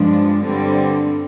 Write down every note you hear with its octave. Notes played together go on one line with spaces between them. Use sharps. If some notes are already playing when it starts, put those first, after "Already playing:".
Already playing: G2 F3 G#3 D4
G2 D3 G3 C4